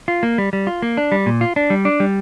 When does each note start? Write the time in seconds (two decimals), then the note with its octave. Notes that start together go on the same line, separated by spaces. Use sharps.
0.08 F4
0.23 A#3
0.38 G3
0.53 G3
0.67 F4
0.82 A#3
0.97 D4
1.12 G3
1.26 A#2
1.41 F4
1.56 D4
1.70 G3
1.85 D4
2.00 G3